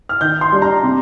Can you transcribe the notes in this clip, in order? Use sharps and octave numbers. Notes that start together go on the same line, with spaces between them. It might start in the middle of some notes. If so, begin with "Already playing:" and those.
F6
D#3 G6
C6
G3 D4
A#5
C3